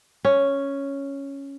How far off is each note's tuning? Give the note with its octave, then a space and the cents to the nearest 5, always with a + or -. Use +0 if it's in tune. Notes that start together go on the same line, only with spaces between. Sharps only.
C#4 +0